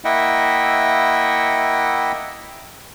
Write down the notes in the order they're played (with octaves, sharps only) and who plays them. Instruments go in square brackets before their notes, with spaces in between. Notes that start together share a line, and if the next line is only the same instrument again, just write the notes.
[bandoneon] A#3 E4 D#5 E5 F#5 G5